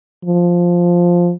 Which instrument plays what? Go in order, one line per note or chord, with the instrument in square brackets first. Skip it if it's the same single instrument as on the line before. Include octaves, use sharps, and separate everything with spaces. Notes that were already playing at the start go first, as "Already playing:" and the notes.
[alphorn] F3